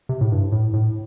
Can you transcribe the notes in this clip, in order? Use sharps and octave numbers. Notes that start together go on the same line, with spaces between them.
C3
A2
G2
A2
A2